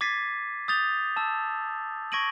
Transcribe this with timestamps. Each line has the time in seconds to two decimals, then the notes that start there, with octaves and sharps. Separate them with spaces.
0.01 D6 G#6 A6 B6 C7 D#7
0.68 D#6 G6 A6 F7 G7
1.16 A5 E6
2.12 C#6 G#6 A#6 D7 D#7 F#7